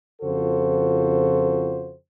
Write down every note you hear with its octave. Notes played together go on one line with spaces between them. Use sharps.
F2 C#3 F4 F#4 A4 C5